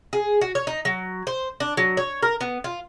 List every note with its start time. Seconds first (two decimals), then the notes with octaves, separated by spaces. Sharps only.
0.13 G#4
0.41 F#4
0.55 C#5
0.67 D#4
0.85 F#3
1.27 C5
1.60 D4
1.77 F#3
1.97 C#5
2.23 A#4
2.41 B3
2.64 F4